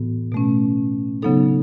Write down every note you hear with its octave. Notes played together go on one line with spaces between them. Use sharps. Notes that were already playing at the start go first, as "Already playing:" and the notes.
Already playing: A2 E3 B3 F#4
B2 A3 C#4
C#3 F#3 B3 D#4 A4